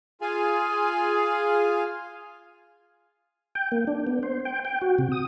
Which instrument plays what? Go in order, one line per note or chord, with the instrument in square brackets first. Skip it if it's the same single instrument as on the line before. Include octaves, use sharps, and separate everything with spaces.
[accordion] F4 F5 G#5 [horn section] G#4
[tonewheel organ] G5
A#3
D4
B3
C5
G5
G5
F#4
C3
D#6